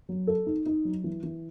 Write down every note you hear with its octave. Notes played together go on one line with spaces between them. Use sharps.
F#3
A4
D#4
D#4
F#3
E3
E3